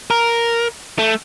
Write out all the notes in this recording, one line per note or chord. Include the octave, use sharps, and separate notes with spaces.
A#4
A3